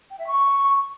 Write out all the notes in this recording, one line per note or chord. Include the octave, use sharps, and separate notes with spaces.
G5
E5
C#6